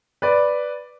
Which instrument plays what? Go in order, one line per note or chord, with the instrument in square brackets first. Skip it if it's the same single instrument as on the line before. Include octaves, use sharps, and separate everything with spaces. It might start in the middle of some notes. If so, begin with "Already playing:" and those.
[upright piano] B4 D5